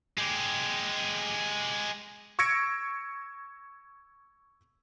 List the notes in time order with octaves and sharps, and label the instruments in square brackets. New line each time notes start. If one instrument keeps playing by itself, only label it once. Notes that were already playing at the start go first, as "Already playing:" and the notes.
[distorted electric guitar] G#3 G4
[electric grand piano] C#6 E6 G#6 A#6 C#7 D7